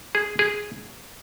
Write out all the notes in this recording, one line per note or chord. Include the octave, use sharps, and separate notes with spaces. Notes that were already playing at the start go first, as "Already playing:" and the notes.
G#4
G#4